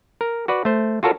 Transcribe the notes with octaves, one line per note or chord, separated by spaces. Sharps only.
A#4
F#4 B4 D5
A3 C5
F4 F#4 A4 A#4 C#5